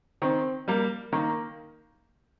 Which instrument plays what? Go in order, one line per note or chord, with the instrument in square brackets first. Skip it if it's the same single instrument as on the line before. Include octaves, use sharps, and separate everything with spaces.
[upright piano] D#3 [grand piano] C4
[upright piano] G3 A#3
[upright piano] D#3 [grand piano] A#3